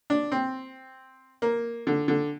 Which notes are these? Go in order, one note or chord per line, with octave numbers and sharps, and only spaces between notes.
D4
C4
A#3
D3
D3